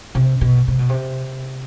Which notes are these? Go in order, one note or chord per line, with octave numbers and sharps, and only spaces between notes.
C3
B2
C3
B2
C3